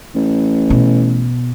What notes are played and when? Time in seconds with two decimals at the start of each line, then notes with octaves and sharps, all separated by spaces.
0.15 A1
0.70 B2